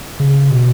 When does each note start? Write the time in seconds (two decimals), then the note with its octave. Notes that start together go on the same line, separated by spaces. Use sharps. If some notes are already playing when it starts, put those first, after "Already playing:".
0.20 C#3
0.51 B2